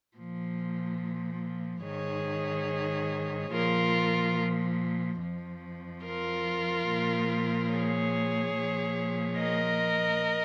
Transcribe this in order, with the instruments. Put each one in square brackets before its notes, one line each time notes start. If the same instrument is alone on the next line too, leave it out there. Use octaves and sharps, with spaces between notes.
[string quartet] A#2 F3
G#2 D#3 G#4 C#5
A#2 F3 F4 A#4
F2 F3
F4 A#4
A#2 F3
G#4 C#5
A#2 F3
A#4 D#5